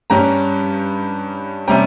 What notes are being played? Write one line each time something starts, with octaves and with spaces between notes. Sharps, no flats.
G2 G3 C#4 G5 A#5
C3 G3 C#4 G5 A#5